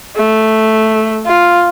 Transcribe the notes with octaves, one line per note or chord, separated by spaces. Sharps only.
A3
F4